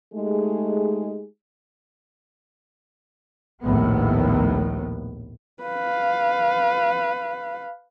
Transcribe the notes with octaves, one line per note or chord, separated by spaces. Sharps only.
G#3 A3 D#4 G4 G#4
A#1 D#2 A2 B3
B4 F5